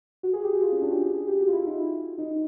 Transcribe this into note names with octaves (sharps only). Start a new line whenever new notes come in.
F#4
G#4
G4
F#4
F4
C#4
D4
G4
G4
G#4
G4
F#4
F4
E4
D#4
D#4